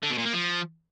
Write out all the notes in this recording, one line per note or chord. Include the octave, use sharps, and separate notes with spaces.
D3
B2
A#2
A#3
F3